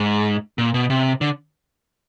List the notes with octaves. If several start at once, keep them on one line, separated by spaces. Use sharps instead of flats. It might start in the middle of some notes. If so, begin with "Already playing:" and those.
Already playing: G#2
A#2
B2
C3
D3